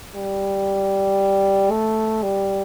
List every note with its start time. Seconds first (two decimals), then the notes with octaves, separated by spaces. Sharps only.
0.15 G3
1.70 A3
2.22 G3